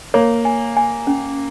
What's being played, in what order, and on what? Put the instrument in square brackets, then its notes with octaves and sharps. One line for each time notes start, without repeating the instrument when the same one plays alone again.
[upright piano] A#3 [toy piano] C#5
[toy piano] G#5
G#5
C#4